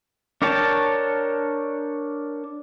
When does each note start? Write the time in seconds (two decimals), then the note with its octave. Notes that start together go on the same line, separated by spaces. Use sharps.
0.42 D4 A#4 C#5 G5 A5